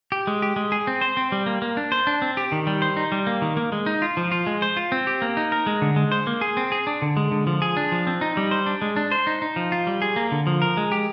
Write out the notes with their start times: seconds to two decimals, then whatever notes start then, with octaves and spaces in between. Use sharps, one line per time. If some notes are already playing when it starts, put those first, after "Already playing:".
0.12 G4
0.27 G#3
0.42 G4
0.56 G#3
0.72 G#4
0.87 C4
1.01 C5
1.17 C4
1.32 G3
1.46 A#3
1.62 A#3
1.77 D4
1.92 C5
2.07 D4
2.22 C4
2.37 G4
2.52 D#3
2.67 G3
2.82 C5
2.97 D#4
3.12 G3
3.27 A#3
3.42 D#3
3.57 A#3
3.72 G#3
3.86 D#4
4.02 F4
4.17 F3
4.32 F4
4.47 G#3
4.62 C5
4.77 F4
4.92 C4
5.07 G4
5.22 A#3
5.37 D#4
5.52 A#4
5.66 G#3
5.82 D3
5.96 G#3
6.12 C5
6.27 A#3
6.41 G#4
6.57 C4
6.72 G#4
6.87 D4
7.02 D3
7.17 G#3
7.32 D3
7.47 F3
7.62 G#4
7.77 D4
7.92 F3
8.07 C4
8.21 D#4
8.37 G3
8.51 C5
8.66 D4
8.82 G#3
8.96 D4
9.12 C5
9.27 D#4
9.42 D#4
9.56 F3
9.72 F4
9.87 G3
10.02 G#4
10.16 A#3
10.32 D3
10.47 F3
10.62 A#4
10.77 G#3
10.92 G4